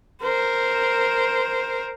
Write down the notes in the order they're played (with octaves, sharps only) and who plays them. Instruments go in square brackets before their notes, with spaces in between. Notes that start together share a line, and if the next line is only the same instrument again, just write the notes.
[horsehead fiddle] A#4 C5